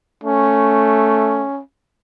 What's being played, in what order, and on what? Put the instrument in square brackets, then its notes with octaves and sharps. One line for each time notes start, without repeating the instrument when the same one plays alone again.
[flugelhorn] A3 [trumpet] C#4